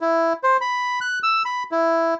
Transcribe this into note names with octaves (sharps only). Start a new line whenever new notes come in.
E4
C5
B5
F#6
E6
B5
E4